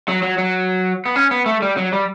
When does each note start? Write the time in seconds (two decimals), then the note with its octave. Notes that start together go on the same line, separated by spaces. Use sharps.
0.08 F#3
0.23 F#3
0.38 F#3
1.06 B3
1.16 C#4
1.31 B3
1.46 A3
1.62 G3
1.77 F#3
1.93 G3